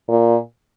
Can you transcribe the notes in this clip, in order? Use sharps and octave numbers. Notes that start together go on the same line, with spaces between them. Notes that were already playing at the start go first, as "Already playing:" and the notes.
A#2